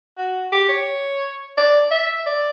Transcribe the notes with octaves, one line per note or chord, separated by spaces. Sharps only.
F#4
G4
C#5
D5
E5
D5